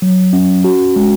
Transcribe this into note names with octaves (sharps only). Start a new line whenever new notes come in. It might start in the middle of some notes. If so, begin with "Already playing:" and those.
F#3
C#4
F#4
G#3